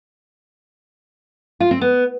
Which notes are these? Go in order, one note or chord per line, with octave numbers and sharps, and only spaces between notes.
F4
C4
B3